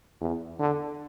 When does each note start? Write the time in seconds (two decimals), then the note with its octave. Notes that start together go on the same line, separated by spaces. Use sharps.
0.21 E2
0.59 D3